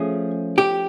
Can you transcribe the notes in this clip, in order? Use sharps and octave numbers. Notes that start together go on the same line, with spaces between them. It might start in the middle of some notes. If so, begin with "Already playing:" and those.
Already playing: F3 A3 C#4 G#4
G4